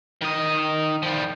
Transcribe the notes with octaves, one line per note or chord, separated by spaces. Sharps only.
D#3 D#5
F3 G3